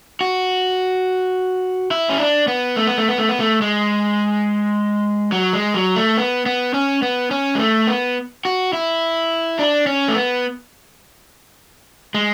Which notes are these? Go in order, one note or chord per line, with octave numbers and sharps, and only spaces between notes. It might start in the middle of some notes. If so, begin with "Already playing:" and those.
F#4
E4
C#4
D4
B3
A3
B3
A3
B3
A3
B3
A3
G#3
F#3
G#3
F#3
A3
B3
B3
C#4
B3
C#4
G#3
A3
B3
F#4
E4
D4
C#4
A3
B3
G#3